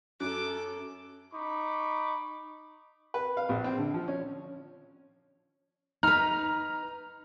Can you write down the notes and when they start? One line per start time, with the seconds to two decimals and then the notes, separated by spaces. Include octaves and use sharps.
0.20 F#2 C#4 F#4 A4 D6
1.34 D#4 B5 C#6 D6
3.14 B4
3.37 F5
3.49 A#1
3.64 C4
3.78 D3
3.94 F3
4.08 C#4
6.03 D#4 B4 A#5 F6